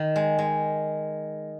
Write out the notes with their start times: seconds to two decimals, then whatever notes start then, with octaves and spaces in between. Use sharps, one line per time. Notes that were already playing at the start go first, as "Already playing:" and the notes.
Already playing: D#3
0.16 G#3
0.39 G#3